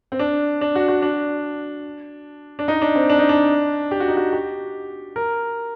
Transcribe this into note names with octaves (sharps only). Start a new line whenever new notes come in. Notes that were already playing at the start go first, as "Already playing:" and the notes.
C4
D4
D4
F#4
F#4
D4
D4
D#4
D4
C4
D4
D#4
D4
G4
F#4
D#4
F#4
G4
A#4